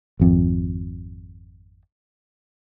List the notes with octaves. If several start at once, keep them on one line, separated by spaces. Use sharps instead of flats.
G#1 F2